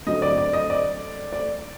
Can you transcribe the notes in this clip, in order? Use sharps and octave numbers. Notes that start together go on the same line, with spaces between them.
D3 F#3 A3 C4 D#5
D5
D5
D#5
D5
D5